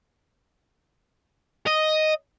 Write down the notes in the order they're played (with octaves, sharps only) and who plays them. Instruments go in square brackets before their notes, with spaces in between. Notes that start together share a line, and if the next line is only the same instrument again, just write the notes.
[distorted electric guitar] D#5